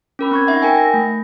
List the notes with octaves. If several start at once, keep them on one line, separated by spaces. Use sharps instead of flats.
C#4 A#4 B5
C4 C#6 G#6
D#4 E5 F#5
A#4 G5 G#5
A#6
A3